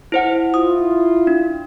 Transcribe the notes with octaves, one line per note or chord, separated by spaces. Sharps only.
E4 C5 F#5
E4 F4 D#6
D4